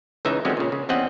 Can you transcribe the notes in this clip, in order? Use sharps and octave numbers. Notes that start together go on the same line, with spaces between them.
C#2 C#3 E3 D#4 E5
D3 F3 F#3 G#3 C4 C#4
A#2 C#3
C#3
E2 G3 C4 C#4 D#5 F#5